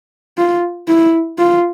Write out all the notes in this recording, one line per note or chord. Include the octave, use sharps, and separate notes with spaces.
F4
E4
F4